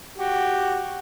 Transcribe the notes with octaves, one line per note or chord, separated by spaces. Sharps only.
F#4 G4